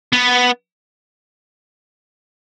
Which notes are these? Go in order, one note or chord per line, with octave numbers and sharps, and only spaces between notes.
B3